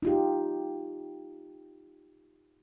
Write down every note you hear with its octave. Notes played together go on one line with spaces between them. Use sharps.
D#4 F4 G4